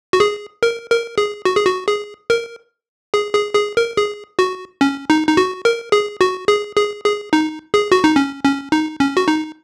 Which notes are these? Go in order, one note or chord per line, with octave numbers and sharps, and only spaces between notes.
F#4
G#4
A#4
A#4
G#4
F#4
G#4
F#4
G#4
A#4
G#4
G#4
G#4
A#4
G#4
F#4
C#4
D#4
D#4
F#4
A#4
G#4
F#4
G#4
G#4
G#4
D#4
G#4
F#4
D#4
C#4
C#4
D#4
C#4
F#4
D#4